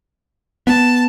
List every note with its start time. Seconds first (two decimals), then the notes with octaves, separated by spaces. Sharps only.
0.67 B3 A5